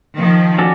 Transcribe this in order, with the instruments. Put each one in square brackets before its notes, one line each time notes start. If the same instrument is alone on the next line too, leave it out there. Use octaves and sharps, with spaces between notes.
[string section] D#3 F3
[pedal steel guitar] C#4 F#4 A4 D5